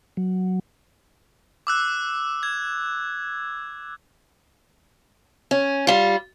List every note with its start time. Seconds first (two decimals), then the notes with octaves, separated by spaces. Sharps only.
0.17 F#3
1.67 D6 E6 F#6
2.43 G#6
5.51 C#4
5.87 G3 F4